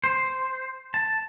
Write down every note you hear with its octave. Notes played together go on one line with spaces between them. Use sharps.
C5
A5